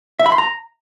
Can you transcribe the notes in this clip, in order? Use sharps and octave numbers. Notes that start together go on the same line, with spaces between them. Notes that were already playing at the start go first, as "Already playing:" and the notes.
E5
B5
C6
A#5